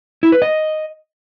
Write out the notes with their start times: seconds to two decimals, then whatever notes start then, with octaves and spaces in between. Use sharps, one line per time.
0.23 E4
0.32 B4
0.42 D#5